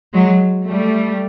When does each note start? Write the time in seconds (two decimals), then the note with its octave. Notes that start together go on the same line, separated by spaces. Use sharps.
0.14 F#3 G#3
0.66 G3 A3